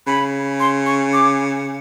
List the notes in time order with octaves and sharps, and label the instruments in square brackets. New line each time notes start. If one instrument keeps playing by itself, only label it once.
[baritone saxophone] C#3 [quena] B5
[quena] C6
C#6
D6